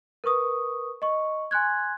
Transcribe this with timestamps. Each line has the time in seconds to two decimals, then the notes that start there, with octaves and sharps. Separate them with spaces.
0.24 A#4 B4 C#6 D#6
1.02 D#5 C#6
1.51 G#5 C6 F#6 G#6